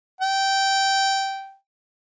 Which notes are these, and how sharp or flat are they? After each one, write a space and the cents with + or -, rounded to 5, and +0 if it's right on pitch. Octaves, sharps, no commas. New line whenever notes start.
G5 -10